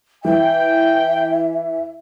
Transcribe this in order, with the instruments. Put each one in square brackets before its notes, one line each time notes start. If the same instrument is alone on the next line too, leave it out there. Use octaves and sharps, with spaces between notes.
[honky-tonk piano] E3 [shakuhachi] E5 [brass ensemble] G5